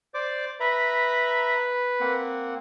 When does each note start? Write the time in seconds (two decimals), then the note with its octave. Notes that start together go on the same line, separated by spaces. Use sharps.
0.14 C5 D5 D6
0.60 B4 E5 A#5 B5
2.00 A#3 C4 F#5